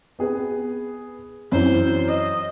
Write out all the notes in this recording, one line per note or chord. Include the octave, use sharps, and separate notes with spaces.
B3 G#4 B4
F#2 E3 C5
D#5